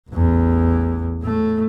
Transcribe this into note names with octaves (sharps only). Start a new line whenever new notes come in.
A1 E2
A2 A3